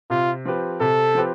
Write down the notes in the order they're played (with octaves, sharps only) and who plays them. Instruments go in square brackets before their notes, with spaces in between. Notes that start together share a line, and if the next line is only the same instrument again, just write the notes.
[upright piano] C3 [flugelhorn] F4
[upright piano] F3 C4 G4 B4
[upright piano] C3 [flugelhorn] A4
[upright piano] F3 C4 G4 B4